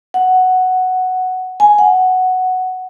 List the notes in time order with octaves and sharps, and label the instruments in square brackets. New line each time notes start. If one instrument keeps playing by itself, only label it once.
[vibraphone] F#5
G#5
F#5